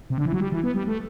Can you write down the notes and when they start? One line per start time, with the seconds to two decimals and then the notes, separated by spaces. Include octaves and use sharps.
0.10 C3
0.18 D3
0.26 E3
0.33 F#3
0.40 G3
0.52 E3
0.63 B3
0.75 G3
0.87 A3